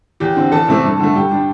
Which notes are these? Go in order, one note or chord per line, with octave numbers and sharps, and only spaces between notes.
E2 G4 G5
D3 C4
E2 A4 A5
C3 A3 C4
G2
D3 A3
G2 G4 G5
G3 D4